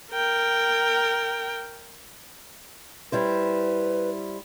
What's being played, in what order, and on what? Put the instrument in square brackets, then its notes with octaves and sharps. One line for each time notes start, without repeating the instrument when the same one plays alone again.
[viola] A#4 G5
[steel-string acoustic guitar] G3 E4 C5 [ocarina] B4